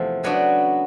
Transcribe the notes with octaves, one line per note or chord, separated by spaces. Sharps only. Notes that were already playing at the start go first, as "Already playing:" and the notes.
Already playing: E2 C3 F3 A3
C#3 F#3 B3 D4 F#4